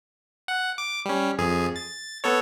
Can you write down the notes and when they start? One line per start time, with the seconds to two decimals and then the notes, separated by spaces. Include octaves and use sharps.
0.48 F#5
0.78 D6
1.05 G3 C#4
1.38 F2 G#4
1.76 A6
2.24 B3 A4 C#5